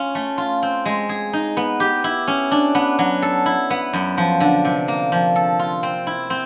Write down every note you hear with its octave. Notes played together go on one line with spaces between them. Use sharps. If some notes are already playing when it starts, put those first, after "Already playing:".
Already playing: C#4 F4
A3
F4
C4
G#3
G#4
D#4
B3
G4
E4
C#4
D4
B3
F#3
A4
E4
B3
F#2
F3
D3
C3
A#3
F3
A4
F4
C4
E4
C4